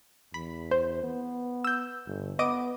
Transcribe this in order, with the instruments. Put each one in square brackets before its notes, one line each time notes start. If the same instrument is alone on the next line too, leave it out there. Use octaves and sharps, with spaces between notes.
[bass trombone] E2 [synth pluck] B5
[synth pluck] C5
[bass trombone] B3
[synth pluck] E6 G6
[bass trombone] G1
[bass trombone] B3 [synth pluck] D#5 D6 D#6